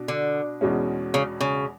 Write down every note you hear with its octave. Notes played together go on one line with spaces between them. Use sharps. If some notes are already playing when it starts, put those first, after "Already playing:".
Already playing: B2 D4
D3
E2 B2 G#3 C#4
C#3
C#3